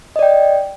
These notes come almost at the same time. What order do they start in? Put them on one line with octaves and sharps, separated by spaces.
D#5 D5 G5